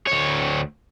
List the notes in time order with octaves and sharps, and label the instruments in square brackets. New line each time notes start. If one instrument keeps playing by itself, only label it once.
[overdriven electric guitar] D2 C#5